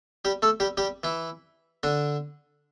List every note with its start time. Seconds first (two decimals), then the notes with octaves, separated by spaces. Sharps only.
0.25 G3 G4
0.42 A3 A4
0.60 G3 G4
0.77 G3 G4
1.03 E3 E4
1.83 D3 D4